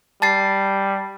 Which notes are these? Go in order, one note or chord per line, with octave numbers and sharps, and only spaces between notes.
G3 A5 A6 C7